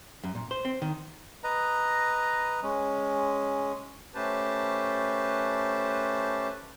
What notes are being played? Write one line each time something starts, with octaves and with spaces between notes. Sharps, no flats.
F#2
A#2
C5
C4
D#3
B4 D#5 A#5
G#3 C#4
A3 C#4 G4 B4 C5 A5